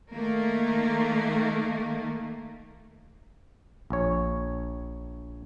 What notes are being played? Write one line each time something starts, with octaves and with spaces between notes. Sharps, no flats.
D#3 A3 A#3
A#1 C#5